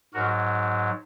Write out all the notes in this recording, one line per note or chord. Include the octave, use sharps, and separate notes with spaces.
G#2 F#3 F#4 A#4